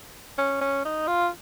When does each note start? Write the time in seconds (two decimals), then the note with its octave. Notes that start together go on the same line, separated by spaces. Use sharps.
0.38 C#4
0.61 C#4
0.85 D#4
1.07 F4